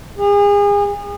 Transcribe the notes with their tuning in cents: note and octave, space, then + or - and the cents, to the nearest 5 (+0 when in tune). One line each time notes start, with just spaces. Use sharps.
G#4 -35